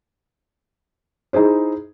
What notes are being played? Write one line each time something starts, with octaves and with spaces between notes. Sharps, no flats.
D#4 E4 G#4 C5